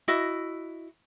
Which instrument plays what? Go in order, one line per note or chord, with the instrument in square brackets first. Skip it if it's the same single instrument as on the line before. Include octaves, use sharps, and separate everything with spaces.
[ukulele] E4 F#4 D#5